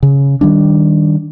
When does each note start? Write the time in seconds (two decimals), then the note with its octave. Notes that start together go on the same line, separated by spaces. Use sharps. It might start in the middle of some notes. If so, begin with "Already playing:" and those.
0.03 C#3
0.41 D#3 G3 D4